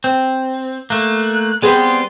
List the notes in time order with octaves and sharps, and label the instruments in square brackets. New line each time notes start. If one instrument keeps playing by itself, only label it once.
[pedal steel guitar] C4
[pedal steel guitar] A3 A#3 [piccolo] F#6
[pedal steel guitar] G3 B3 C4 [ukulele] G#4 B4 C5 [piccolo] C6